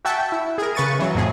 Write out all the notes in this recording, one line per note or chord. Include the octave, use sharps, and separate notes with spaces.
F#4 E5 G5 A5
E4
G#4 A#4
C#3 B4 C#6 A6 D#7
E3 F#3
F2 A2 G#4